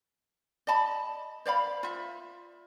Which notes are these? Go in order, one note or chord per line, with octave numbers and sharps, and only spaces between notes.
D5 D#5 A5 B5
C5 D5 F5 B5
F4 E5